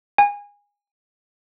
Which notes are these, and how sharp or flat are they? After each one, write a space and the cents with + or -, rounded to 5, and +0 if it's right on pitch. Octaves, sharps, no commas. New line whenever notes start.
G#5 -25